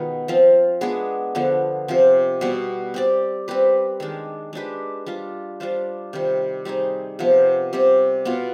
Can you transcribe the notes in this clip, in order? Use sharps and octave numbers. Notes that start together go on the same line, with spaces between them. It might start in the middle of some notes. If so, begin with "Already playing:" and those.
Already playing: B2 D#3 G#3 B3 D#4 F4 B4
F3 C4 F4
G#3 B3 D4 G#4
D3 F3 B3
C3 F3 C4
B2 G3 B3
C4 G4 D5
G3 C4 G4 B4
D#3 G#3 D4
G#3 D4 G4 B4
G3 D4 F4
G3 D4 F4 C5
C3 D#3 G3
G3 C4 D#4 G#4
C3 F3 B3
C3 G3 C4 G4
B2 B3 F4